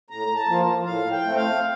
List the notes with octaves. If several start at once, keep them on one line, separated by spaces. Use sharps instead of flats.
A2 A#5
A5
F3 A#3 F4
A2 F5
G5
A3 C4
F5